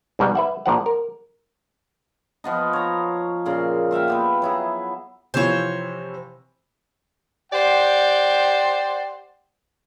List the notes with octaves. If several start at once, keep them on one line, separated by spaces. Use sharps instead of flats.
G#2 B2 G3 B3
B4 E5 F#5
A#1 A#2 F3 F#5
A#4
F3 B3 D#4
C#5 A#5
A#2 C#3 A#3 C6
C5 E5 F5 G5
B3 G4 B4
F#3 E4 G#4
C3 E3 F3 C5 C#5
G4 C5 D5 F#5 G5